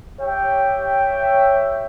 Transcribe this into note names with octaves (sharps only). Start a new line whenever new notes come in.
G4 C#5 E5 G5